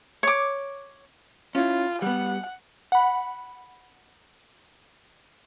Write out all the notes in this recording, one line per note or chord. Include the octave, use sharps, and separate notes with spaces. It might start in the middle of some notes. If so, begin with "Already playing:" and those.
C#5 D6
C#4 E4 F4
G3 B3 F#5
F#5 B5